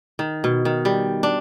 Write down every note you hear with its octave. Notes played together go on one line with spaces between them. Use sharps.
D#3
B2
D#3
G3
D4